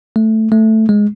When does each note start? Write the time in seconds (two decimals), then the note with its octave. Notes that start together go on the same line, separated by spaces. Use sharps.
0.16 A3
0.52 A3
0.89 G#3